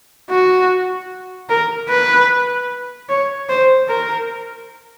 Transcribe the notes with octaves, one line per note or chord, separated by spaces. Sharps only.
F#4
A#4
B4
C#5
C5
A#4